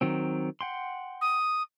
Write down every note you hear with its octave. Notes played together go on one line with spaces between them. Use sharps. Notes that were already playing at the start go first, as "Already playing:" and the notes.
D#3 F#3 C4
F#5 G5 C6
D#6